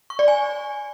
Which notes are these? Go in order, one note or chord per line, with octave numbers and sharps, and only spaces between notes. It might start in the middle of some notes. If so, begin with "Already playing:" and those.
C#6
D5
G#5